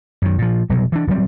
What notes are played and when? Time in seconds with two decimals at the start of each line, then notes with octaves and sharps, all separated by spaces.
0.22 F#2 D#3
0.38 A#2 F3
0.69 F1 B2 F#3 G3
0.92 E3 D4
1.07 D#1 F#3 G3 C4